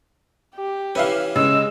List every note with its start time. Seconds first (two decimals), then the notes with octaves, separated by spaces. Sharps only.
0.56 G4
0.95 E3 C#4 B4 E5 F5
1.36 C#3 G#3 E6